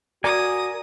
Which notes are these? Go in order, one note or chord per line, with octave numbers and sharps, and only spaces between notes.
F#4 A#4 D5 G#5 D#6